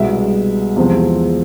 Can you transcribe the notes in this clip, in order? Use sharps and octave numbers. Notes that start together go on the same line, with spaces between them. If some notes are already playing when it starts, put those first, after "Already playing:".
Already playing: C2 B2 G#3 B3 E5
E2 C3 F3 G#3 C4